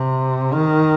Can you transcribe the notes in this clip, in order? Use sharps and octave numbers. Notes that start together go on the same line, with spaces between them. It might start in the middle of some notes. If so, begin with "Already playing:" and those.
Already playing: C3
D#3